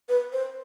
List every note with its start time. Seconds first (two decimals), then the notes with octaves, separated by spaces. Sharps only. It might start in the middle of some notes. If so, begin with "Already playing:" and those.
0.09 B4
0.33 C5